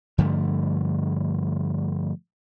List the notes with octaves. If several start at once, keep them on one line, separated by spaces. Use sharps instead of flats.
G2 D3 F3 A3